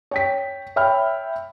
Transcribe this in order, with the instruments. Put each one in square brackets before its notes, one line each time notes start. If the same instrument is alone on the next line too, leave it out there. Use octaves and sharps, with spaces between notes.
[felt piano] C#5 G5 B6
C#5 E5 G5 B5 F6